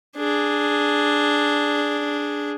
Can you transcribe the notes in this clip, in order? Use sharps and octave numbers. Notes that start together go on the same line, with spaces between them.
D4 G#4